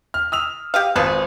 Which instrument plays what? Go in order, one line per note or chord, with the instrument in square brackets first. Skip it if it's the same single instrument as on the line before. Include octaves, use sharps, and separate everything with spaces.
[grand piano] F6
D#6 E6 F7
[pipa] G4 D#5 F5
[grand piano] G#1 [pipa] F3 G#4 B4